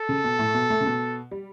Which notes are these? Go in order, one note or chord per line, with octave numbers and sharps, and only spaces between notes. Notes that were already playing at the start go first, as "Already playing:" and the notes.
Already playing: A4
C#3
B2
A2
B2
A3
C#3
B2
G3